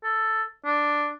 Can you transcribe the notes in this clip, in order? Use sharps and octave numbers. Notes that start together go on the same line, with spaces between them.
A4
D4